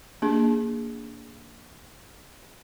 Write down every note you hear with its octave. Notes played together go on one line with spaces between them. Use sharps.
A#3 D4 G#4